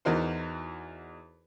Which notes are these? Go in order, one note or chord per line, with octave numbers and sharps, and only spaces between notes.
E2 E3 D#4 F#4 A#4 C5